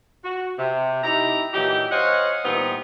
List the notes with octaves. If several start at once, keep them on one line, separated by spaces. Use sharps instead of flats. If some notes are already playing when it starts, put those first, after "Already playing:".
F#4
C3
D#4 E4 G4 A#5
A#2 E3 F#3 D#4 G4
C5 C#5 D#5 F5 F#5 G#5
A#2 E3 G3 B3 C4 D#4